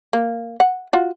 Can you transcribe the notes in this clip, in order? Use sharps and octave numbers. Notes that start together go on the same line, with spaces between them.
A#3
F#5
F4 F#4